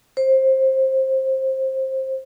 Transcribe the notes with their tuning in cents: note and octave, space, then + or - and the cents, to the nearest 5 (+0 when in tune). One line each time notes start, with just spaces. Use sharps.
C5 +20